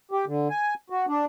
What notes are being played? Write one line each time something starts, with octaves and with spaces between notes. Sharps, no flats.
G4
D3
G#5
F#4
D4